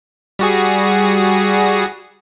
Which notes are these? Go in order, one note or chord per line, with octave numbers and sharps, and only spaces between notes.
G3 F#4 G#4